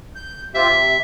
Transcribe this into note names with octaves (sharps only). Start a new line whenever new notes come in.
G6
C4 F4 G4 E5
C3